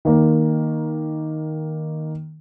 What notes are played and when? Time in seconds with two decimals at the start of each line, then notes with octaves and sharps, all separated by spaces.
0.05 D#3 A#3